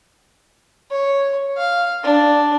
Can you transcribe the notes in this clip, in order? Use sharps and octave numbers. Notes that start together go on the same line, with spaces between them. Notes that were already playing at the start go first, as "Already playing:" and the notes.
C#5
F5
D4